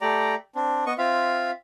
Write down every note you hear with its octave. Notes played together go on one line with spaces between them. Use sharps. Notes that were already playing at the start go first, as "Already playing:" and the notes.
A3 G4 D5 A#5
C4 D4
B3 D#5 C#6
C4 F4 E5 F5